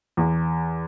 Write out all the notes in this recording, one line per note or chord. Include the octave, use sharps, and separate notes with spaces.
E2